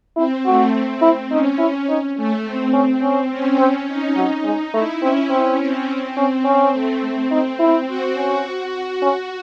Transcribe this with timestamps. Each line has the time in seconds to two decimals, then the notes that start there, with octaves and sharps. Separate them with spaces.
0.16 C4 E4
0.45 A3 F#4
0.74 C4
1.02 E4
1.31 C#4 D#4
1.59 E4
1.88 D#4
2.16 A3 C#4
2.45 C4
2.73 C#4
3.02 C#4
3.30 C#4
3.59 C4 C#4
3.88 D#4
4.16 F#3
4.45 G#3
4.73 A3 E4
5.02 C4 C#4
5.30 C4
5.59 C4
6.17 C#4
6.45 C#4
6.73 A3
7.02 C4
7.30 C4 D#4
7.59 E4
7.88 F#4
8.16 C#4
9.02 C#4 F#4